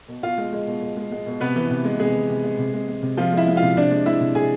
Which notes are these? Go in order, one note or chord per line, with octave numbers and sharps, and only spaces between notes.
B2
B2 F4 F5
G#3
G#3
B2
B2
G#3
G#3
B2
C3 B3 B4
E3
C3
G#3
C3 G#3 G#4
E3
C3
G#3
C3
G#3
G#3
C3
C3 F3 F4
G#3 E4 E5
G#3
F4 F5
C3
C3 D4 D5
G#3
G#3 E4 E5
C3
C3 G#4 G#5